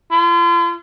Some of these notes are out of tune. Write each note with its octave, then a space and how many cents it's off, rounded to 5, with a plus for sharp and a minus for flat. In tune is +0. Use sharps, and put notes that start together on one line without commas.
F4 -40